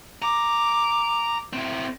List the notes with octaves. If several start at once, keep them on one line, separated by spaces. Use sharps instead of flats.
A#5 D6
A2 C4